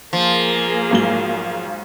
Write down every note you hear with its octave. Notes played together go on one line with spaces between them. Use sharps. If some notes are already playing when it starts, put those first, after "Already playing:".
F3 A#3 G#4
B1 G#2 G7